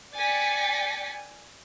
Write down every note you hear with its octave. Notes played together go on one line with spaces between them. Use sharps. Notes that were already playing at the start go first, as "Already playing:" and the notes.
D5 G5 G#5 A6 B6 C#7